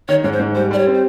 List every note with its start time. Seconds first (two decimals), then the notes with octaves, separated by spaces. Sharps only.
0.08 D#3 C#5
0.24 G#2 C#5
0.32 C5
0.40 G#2
0.55 G3 C5
0.71 G3 D5
0.79 C#5
0.87 C4
0.94 C5